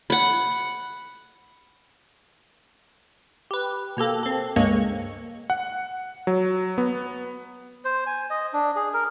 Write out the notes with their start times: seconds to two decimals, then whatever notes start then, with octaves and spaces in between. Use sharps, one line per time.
0.10 F#5 B5
3.51 G4 B4
3.97 B2 A#3 G4 A4
4.23 C4 A4
4.56 C#2 G2 G#3 A#3 C#6
5.50 F#5
6.27 F#3
6.78 B3
7.85 C5
8.07 G#5
8.30 D#5
8.53 D4
8.76 G#4
8.94 A#4